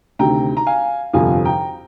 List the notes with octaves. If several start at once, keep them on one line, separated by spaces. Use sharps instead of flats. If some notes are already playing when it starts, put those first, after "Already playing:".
D2 C3 D#3 G5 A#5
A#5
F5 G#5
G1 F2 C3 F3 F5 G#5
G5 A#5